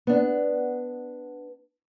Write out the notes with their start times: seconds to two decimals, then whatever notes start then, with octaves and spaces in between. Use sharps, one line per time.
0.07 B3 D4